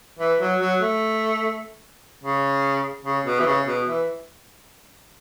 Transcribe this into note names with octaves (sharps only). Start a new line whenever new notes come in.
E3
F#3
F#3
A3
C#3
C#3
B2
E3
C#3
B2
E3